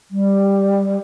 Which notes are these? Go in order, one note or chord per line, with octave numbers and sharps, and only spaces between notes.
G3